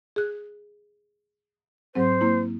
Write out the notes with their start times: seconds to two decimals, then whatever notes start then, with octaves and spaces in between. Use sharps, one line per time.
0.16 G#4 F#6
1.95 G#2 F#3 C4 C5
2.21 A#3 E4